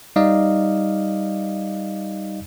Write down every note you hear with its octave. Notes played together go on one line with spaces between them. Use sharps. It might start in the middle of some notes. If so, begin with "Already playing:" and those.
G3 D#4 D5 D#5 F5